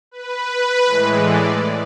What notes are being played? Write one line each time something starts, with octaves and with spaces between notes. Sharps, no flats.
B4
A2 E3 G#3
D5